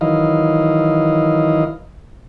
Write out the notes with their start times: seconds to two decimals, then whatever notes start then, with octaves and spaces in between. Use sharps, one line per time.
0.01 D#3 E3 F#3 E4 D#5 F5